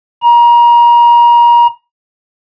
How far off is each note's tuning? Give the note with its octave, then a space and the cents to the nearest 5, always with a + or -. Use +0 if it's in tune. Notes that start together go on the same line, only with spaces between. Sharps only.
A#5 +30